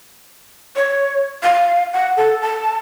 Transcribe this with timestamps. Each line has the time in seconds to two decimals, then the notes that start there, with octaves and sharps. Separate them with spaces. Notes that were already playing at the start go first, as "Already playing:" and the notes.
0.76 C#5
1.43 F5
1.93 F#5
2.17 A4
2.42 A5